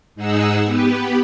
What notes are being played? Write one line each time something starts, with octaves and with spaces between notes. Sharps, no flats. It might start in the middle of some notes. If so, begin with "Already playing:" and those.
G#2 D#4 G#4 F#5 E6
B3 G4 B4